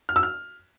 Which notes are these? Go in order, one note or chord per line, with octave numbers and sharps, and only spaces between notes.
F6
E6
F6